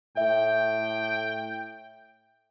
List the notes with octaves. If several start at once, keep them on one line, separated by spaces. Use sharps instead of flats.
A2 E5 G5